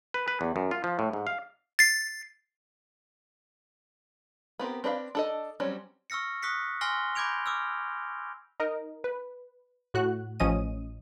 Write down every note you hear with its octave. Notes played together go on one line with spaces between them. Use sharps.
B4
B4
E2
F#2
F4
F3
A2
G#2
F5
A6 C7
B3 C4 G4 A#4
C4 D4 B4 D#5 F5
D4 A4 D#5
F#3 G3 C4 C#4
C#6 E6 F6 A#6 C#7
C#6 D#6 F#6 B6 C#7
G#5 C6 F6 A#6 C7 G7
B5 D6 G6 G#6 D7 F7
D6 E6 F6
D#4 A#4 D#5
B4
A2 F#4 F#6
A1 F3 C#4 D#5 D#6 D#7